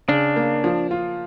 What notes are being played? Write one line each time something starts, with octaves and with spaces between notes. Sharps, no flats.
C#3 D4
A#3
F3
F4